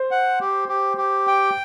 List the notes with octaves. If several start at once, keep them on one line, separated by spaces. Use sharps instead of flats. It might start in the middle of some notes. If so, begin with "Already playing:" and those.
Already playing: C5
F#5
G4
G4
G4
G5